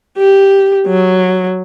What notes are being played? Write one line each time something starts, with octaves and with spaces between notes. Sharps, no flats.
G4
F#3